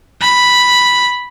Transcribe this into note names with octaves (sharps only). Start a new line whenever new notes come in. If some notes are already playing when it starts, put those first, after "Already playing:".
B5